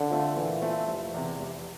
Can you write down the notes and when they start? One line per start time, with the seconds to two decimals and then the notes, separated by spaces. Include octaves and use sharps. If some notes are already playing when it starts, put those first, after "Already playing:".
Already playing: D3
0.09 A3 C4 F4
0.36 A#2 E3
0.62 A3 C4 F4
0.87 F1
1.14 E2 C3
1.40 F1